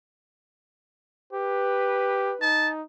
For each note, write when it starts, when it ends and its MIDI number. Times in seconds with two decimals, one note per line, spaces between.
1.33 2.33 67
1.33 2.48 71
2.41 2.82 63
2.41 2.69 81